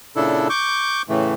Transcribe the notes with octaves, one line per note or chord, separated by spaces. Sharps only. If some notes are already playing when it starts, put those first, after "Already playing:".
A#2 C#3 D4 E4 A4
C#6 D6 G6
A2 C#3 E3 A3